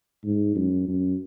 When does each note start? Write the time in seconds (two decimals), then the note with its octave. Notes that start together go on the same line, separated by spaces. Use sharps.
0.25 G#2
0.56 F#2
0.88 F#2